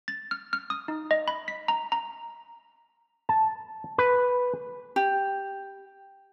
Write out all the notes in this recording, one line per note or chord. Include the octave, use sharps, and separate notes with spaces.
A6
F6
F6
D#6
D#4
D#5
B5
B6
A#5
A#5
A5
B4
G4